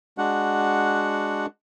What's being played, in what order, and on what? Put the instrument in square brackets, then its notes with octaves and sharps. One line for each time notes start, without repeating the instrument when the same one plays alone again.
[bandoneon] G#3 D4 F#4 F#5